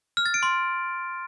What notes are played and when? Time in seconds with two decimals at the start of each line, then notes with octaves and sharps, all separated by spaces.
0.17 F6
0.26 A6
0.34 D7
0.43 C6